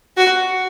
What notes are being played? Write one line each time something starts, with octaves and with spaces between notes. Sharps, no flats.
F#4